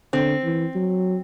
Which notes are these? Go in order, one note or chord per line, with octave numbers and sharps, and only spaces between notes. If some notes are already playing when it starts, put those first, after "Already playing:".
D3 C4
E3
F#3